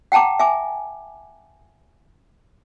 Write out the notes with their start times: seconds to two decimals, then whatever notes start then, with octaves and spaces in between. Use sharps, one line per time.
0.12 F#5 G5 A5 A#5 D6
0.39 E5 G#5 D6